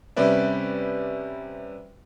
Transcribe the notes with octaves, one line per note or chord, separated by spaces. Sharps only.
C3 G3 C#4 B4 D5 E5